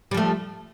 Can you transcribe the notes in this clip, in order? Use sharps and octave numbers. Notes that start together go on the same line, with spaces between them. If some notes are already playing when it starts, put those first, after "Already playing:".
F3 G3 A3